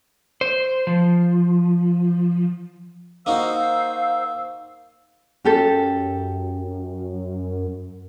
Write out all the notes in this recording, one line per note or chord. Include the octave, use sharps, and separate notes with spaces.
C5
F3
A#3 D#4 F#4 C5 F5 E6
F#2 C#4 G4 A4